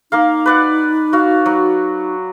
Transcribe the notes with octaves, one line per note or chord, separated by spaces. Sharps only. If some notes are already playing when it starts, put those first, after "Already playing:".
A#3 D#4 A#4 F5
B4 D5 F#5
F#4 F5
F#3